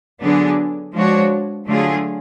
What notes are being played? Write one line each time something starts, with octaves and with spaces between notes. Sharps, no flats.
D3 F#3 B3 D4 G#4
F3 G#3 D4 F#4 C#5
D3 F#3 A3 F4 G#4